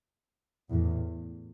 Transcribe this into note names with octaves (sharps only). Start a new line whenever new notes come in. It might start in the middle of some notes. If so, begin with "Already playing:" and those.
E2 A2